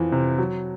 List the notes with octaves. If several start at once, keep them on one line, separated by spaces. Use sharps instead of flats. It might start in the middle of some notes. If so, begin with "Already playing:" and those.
Already playing: F2 E3
C3
F#3